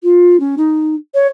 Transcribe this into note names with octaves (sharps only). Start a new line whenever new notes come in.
F4
C#4
D#4
C#5